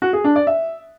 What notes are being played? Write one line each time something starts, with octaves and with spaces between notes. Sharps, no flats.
F#4
G#4
D4
D5
E5